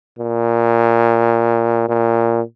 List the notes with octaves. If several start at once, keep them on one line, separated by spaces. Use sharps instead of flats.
A#2
A#2